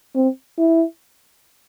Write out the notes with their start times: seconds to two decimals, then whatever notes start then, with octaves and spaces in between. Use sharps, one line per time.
0.16 C4
0.58 E4